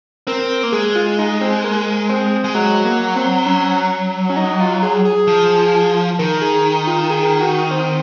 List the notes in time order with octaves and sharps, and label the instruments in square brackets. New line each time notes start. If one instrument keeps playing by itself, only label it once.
[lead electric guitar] C4 [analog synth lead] A#4
[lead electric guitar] A#3
[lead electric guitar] G#3 [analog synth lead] G#4
[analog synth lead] F4
D#4
C4
A#3
C4
[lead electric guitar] G#3
[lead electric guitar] F#3 [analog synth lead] G#3
[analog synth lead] A#3
C4
C#4
C#4
D#4
F4
G#4
G#4
[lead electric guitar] F3
[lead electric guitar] D#3 [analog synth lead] A#4
[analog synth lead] G#4
F4
G#4
F#4
C4